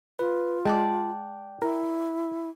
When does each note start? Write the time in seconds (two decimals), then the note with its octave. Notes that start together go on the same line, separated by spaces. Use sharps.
0.19 F4 B4
0.65 G#3 D5 F#5 G5 A5
1.62 E4 A#4